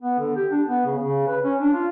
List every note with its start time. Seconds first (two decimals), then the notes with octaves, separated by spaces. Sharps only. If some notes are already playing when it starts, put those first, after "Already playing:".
0.02 B3
0.19 D3
0.36 G4
0.52 D4
0.67 B3
0.86 C#3
0.98 C#3
1.27 B4
1.44 C#4
1.61 D4
1.73 F4